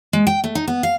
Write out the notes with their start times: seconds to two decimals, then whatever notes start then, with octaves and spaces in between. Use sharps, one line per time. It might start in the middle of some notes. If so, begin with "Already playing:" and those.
0.13 G#3
0.27 G5
0.44 A3
0.55 D#4
0.68 B3
0.83 F5